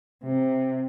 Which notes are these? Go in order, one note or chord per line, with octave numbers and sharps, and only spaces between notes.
C3